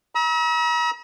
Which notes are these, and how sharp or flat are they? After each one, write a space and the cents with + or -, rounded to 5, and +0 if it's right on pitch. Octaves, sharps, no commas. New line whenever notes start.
A#5 +45 E6 -40